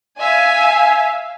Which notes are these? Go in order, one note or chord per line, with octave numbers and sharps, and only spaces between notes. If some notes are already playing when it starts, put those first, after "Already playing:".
E5 F5 G#5